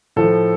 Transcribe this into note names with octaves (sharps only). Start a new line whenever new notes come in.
A2 F3 A4